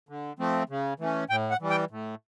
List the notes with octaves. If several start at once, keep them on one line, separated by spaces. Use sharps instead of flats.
D3
F3 A3 C4
C#3
E3 A3 C#4
A2 G5
F#5
E3 G3
G5
A2